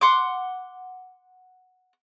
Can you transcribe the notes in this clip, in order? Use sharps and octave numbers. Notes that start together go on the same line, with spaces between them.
F#5 C6 D6